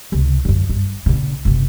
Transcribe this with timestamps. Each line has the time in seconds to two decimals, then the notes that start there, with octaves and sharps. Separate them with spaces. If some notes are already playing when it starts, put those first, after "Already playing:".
0.12 C#2 C3
0.45 F#2 D3
0.69 G2
1.06 A#1 C#3
1.45 F#1 C3